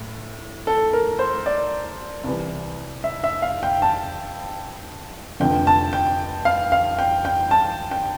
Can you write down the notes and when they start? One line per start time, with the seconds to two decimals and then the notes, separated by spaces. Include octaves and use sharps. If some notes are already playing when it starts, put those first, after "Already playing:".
Already playing: A2
0.67 A4
0.93 A#4
1.19 C5
1.46 D5
2.24 C2 C3 E3
3.04 E5
3.24 E5
3.42 F5
3.63 G5
3.82 A5
5.40 F1 F2 D3 G5
5.67 A5
5.93 G5
6.45 F5
6.72 F5
6.99 G5
7.25 G5
7.51 A5
7.91 G5